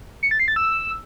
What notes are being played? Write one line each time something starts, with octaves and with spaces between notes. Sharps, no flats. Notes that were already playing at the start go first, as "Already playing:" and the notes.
C#7
A6
C7
A6
E6